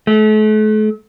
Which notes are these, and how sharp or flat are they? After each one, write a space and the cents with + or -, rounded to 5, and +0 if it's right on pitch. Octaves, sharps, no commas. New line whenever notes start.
A3 -40